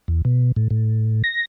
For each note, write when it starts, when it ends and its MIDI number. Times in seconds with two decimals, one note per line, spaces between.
0.08 0.22 40
0.25 0.52 47
0.56 0.68 45
0.70 1.22 45
1.24 1.45 94